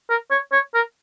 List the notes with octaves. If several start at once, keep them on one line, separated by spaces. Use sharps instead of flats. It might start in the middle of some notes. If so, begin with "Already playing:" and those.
A#4
C#5
C#5
A#4